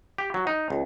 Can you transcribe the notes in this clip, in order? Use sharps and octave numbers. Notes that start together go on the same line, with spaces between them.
G4
F#3
D#4
C#2